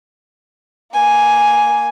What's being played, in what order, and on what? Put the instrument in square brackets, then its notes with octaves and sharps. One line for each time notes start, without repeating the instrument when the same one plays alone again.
[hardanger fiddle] A#3 G#5